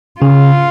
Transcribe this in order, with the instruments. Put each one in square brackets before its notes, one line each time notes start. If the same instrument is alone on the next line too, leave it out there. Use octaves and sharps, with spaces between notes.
[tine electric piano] C#3 [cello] F4